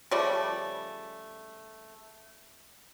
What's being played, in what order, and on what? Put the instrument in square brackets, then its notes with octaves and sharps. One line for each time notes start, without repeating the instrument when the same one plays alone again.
[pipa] C#3 F3 G3 A3